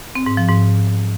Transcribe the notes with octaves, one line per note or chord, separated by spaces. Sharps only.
C4
G#2
F3
G#2